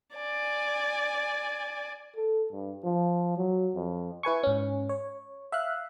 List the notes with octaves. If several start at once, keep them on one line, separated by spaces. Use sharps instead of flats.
D5 G#5
A4
G2
F3
F#3
F2
E4 B4 G#5 C#6
G#2 C#4
C#5
E5 F5 F#6